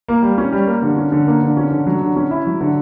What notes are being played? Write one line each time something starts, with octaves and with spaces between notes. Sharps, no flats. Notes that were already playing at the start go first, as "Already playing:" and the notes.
A#3
G3
C#4
G3
A#3
D3
C#4
D3
A#3
D3
C#4
D3
F#3
D3
C#4
E4
F#3
D3